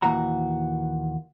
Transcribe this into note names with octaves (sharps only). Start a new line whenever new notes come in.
D#2 A#2 E3 F#4 A#5